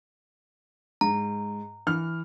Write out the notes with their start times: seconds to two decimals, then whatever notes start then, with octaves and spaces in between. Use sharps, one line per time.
1.01 G#2 A#5
1.87 E3 F6